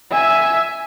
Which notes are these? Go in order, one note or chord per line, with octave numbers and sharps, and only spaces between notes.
E5 G#5